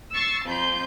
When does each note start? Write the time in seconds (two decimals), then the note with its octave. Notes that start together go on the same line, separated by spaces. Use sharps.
0.14 C#6 E6 A6 C7
0.47 F2 C6 G6